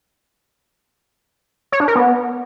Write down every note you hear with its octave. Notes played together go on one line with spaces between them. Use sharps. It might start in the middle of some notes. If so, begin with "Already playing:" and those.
C#5
D4
A#4
B3